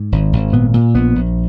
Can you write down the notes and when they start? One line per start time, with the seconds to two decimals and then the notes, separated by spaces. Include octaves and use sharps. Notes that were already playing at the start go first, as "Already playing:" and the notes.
Already playing: G#2
0.12 G#1
0.32 G#1
0.53 A#2 B3
0.74 A#2
0.94 A#1 B3
1.15 A#1